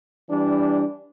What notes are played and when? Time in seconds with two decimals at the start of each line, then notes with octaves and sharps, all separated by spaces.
0.30 E3 G3 D4